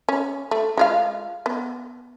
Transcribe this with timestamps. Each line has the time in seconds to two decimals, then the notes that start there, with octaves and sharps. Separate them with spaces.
0.09 C#4
0.51 A3
0.77 G#3 F4 F5
1.46 B3